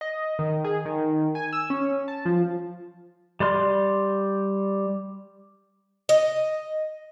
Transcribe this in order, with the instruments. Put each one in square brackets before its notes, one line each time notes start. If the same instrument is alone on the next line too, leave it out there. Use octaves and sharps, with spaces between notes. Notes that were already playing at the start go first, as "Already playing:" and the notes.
[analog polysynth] D#5
D#3
G#4
D#3
G#5
E6
C#4
A5
F3
[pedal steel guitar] G3 D5 C6 F6
[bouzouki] D#5